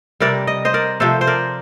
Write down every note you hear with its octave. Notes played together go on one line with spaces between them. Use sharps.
C3 G3 A#4 D5
D#5
C5 D#5
A#4 D5
C3 F3 A3 A4 C5
C5
A#4 D5